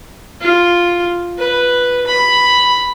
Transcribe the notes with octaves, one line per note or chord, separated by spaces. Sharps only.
F4
B4
B5